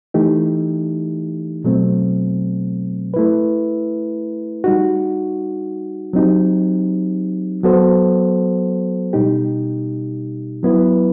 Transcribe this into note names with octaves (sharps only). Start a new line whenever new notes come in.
E3 A3 D#4 G4
B2 F#3 A3 C4
A3 E4 B4
G3 D#4 F#4
F#3 C4 D#4 G4
F#3 B3 F#4 A4 C5
B2 G3 D#4 G4
F#3 B3 E4 B4